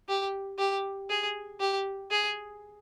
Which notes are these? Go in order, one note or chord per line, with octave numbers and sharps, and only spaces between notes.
G4
G4
G#4
G4
G#4